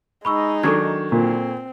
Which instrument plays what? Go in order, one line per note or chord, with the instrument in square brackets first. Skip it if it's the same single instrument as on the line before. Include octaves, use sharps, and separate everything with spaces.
[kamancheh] G#3 D#4 [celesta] B5 C#6 E6
[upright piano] D#3 F#3 D4 [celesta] A4 C#6 G#6
[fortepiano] A#2 [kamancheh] C4